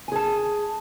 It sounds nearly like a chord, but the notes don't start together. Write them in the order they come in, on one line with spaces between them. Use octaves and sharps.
G#5 G#4 A5